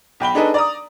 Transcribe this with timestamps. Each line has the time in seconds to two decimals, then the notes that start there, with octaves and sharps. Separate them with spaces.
0.20 B1 G5 B5 G7
0.35 D4 D#4 G#4 A4 B4 D#5
0.54 D5 A#5 D#6